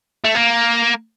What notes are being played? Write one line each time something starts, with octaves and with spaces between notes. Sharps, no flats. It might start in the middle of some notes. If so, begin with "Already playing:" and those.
A3
A#3